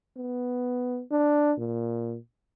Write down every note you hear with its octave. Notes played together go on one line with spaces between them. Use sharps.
B3
D4
A#2